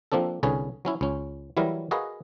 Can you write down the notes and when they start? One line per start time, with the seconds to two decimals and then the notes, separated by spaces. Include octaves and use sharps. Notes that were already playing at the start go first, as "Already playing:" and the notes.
0.12 F3 A#3 C4 D4 A4
0.43 C2 D3 C#4 G#4 B4
0.85 F#3 C#4 E4
1.01 C#2 C#4
1.57 E3 F#3 G3 E4 A#4
1.91 F#4 G#4 A#4 B4 D#5 F5